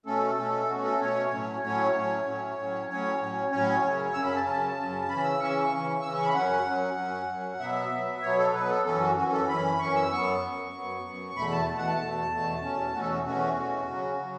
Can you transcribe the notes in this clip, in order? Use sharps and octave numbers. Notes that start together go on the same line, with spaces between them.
B2 A3 C#4 A4
B2 A3 C#4
B2 A3 C#4 F#4
A4
B2 A3 C#4 C#5
A2 F#3 A3 C#4
A2 F#3 A3 C#4 C#5
A2 F#3 A3 C#4
A2 F#3 A3 C#4
A2 F#3 C#4
A2 F#3 C#4 C#5
A2 F#3 C#4
A2 F#3 C#4 C#5
F#2 C#3 F#3 C#4
F#2 C#3 F#3 C#4 E6
B5
A5
F#2 C#3 F#3 C#4 A5
F#2 C#3 F#3 C#4
C#3 E3 C#4 B5
E6
C#3 E3 C#4 C#6
E6
C#6
C#3 E3 C#4
C#3 E3 C#4 E6
C#6
B5
F#2 F#3 C#4 F#5
F#2 F#3 C#4
F#2 F#3 C#4
F#2 F#3 C#4
B2 F#3 B3 E5
B2 F#3 B3
B2 F#3 B3 C#5
A4
B2 F#3 B3 B4
A4
F#2 E3 C#4 A4
F#4
F#2 E3 C#4 F#4
A4
F#2 E3 C#4 B5
F#2 E3 C#4 C#6
E6
F#2 F#3 B3 C#6
F#2 F#3 B3
F#2 F#3 B3
F#2 F#3 B3
E2 B2 A3 B5
A5
E2 B2 A3 A5
F#5
A5
E2 B2 A3
E2 B2 A3
E2 B2 A3 C#4
E2 B2 A3 C#4 F#4
A4
F#4
E2 B2 A3 C#4 F#4
E2 B2 A3 C#4
C#3 F#3 C#4
C#3 F#3